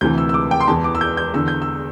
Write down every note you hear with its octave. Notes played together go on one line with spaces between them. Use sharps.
D2 C3 E3 G6
E6
E6
D6
G5
C6
E2 E3 A5
D6
E6
G6
G6
E2 D3 E6
G6
E6